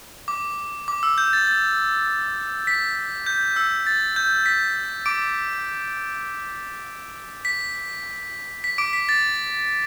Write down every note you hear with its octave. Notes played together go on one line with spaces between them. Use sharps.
D6
D6
E6
G6
A6
A6
B6
G6
E6
A6
G6
B6
D6 D7
B6
B6
D6 D7
B6
A6